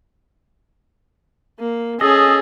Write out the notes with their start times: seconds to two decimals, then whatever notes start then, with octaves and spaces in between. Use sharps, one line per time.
1.59 A#3
2.01 C#4 G#4 A4 D#5